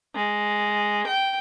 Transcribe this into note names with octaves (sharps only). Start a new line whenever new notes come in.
G#3
G5